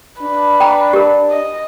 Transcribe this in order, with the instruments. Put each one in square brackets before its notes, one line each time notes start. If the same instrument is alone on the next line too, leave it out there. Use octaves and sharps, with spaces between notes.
[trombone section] D4 [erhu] B4
[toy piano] G5 A#5
G4 A#4
[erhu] D#5